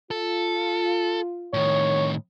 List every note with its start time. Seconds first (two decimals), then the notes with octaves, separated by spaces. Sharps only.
0.11 F4 A4
1.54 A2 D#3 C#5